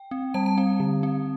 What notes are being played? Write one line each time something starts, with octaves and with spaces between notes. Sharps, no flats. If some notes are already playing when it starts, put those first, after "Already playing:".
Already playing: G5
C4
G3 A5
A5
C4
D3
C4